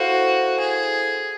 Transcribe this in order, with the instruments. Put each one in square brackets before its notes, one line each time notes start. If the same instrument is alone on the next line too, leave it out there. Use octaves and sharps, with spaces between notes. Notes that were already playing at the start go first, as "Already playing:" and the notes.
Already playing: [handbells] E4 A4 C5 F5 [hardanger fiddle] F#4
[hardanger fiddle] G#4